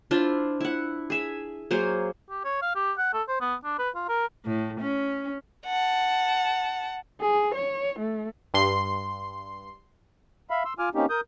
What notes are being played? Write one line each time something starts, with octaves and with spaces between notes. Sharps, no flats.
D4 E4 F4 C5
E4 F#5
G#4 E5
F#3 A#3 G#4 C5
G4
C#5
F5
G4
F#5
A4
C5
B3
D4
B4
F4
A#4
A2
C#4
F#5 A5
G#4
C#5
A3
G2 C6 C7
E5 F5 B5
C6 E6
F4 G#5 D6 F6
A#3 C4 C#4 D#4 G4
A#4 D#6 G6